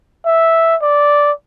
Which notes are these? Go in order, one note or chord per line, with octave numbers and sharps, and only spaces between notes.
E5
D5